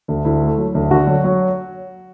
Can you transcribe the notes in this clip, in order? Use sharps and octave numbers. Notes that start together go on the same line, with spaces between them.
D2
D2 E4
A3
F#3
D2
D3 F#4
F#3
F#3